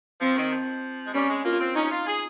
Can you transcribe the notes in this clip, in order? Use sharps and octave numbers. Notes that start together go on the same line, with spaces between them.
F3 C4
D#3
F3
G#3
G3 C#4
G#3
A#3 F4
C4
C#4 D#4
F4
G#4